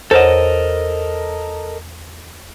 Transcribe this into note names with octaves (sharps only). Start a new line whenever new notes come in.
E2 A4 A#4 C5 C#5 D#5 F#5 E7